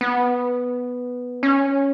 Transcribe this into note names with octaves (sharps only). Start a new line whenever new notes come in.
B3
C#4